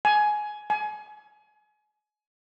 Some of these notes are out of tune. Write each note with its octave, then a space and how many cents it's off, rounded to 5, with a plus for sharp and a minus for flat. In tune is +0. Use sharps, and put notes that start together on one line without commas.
G#5 +15
G#5 +30